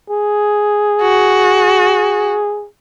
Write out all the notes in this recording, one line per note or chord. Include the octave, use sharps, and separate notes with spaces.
G#4
F#4